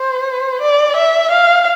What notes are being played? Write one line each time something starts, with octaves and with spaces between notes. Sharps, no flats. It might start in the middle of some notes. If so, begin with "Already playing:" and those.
Already playing: C5
D5
E5
F5